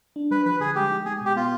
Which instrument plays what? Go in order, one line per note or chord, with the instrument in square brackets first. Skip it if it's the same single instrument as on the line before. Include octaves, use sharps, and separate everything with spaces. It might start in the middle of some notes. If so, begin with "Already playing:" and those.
[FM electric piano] D4
[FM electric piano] G3 [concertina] B4
[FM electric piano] F3 [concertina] B4
[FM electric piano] D3 [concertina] G#4
[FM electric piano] G#3 [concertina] G4
[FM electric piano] D#4
[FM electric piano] G#3 [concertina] G#4
[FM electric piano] B2 [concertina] G4
[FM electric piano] B3 [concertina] F4